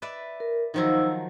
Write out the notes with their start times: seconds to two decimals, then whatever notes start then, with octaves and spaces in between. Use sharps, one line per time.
0.02 B4 D5 E5
0.40 A#4
0.74 D#3 F3 F#3 D#4 C5 E6